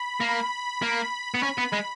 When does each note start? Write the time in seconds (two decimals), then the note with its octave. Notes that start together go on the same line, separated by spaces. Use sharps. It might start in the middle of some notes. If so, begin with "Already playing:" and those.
Already playing: B5
0.20 A#3
0.82 A#3
1.34 B3
1.43 C#4
1.58 B3
1.73 G#3